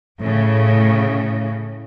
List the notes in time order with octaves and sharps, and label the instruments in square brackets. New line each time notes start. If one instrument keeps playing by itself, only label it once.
[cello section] A2 C#3